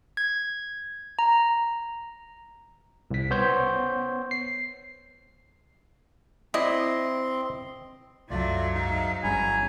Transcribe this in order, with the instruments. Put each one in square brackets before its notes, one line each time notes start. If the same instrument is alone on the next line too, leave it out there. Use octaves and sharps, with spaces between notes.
[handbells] G#6
A#5
[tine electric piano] C2 B6
B3 C5 C#5 G6
C7
[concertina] C4 C6 [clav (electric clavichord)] E4 D5 [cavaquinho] D#5
[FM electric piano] C2 F#2 E5 [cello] F#3 [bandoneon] A3 F4 D5
[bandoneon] G#2 D#4 F5
[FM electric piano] G1 G2 B5 [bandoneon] E2 C#4 A#5 [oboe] G#5